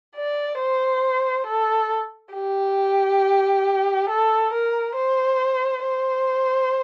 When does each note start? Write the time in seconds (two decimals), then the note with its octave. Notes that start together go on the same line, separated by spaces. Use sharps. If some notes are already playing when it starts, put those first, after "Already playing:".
0.16 D5
0.59 C5
1.47 A4
2.34 G4
4.10 A4
4.53 A#4
4.96 C5
5.84 C5